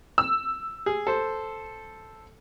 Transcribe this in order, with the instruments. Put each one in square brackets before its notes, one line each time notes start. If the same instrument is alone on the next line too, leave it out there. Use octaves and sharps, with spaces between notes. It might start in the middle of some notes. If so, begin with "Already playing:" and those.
[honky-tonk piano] E6
[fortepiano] G#4
A4 C5